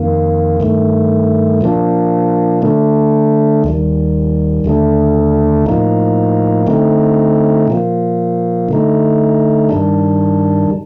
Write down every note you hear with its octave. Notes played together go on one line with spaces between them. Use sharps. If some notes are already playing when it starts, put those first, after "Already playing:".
Already playing: F2 D#3 A#3
G2 D#3 A3
A#2 F3 A#3 D4
D3 A3 D4
D#2 D#3 G3
D#2 D3 A3 D4
A2 F3 A#3 D#4
D3 A3 C4 D#4
A#2 F3 A#3
D3 A3 D#4
G2 D#3 G3 D4